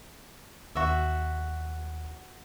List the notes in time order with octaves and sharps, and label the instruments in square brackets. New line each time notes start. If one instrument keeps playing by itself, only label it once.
[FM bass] D#2 [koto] F#4 E5